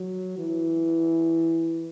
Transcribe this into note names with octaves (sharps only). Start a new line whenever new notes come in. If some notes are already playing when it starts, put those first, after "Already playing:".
Already playing: F#3
E3